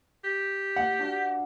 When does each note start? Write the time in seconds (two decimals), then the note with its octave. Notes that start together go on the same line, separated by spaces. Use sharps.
0.24 G4
0.76 F#5
0.99 D4 F#4 F5